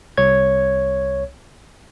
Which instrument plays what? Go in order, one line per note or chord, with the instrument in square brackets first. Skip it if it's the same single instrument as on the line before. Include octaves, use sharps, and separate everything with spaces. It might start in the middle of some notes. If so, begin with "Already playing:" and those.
[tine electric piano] C2 C#5 G#6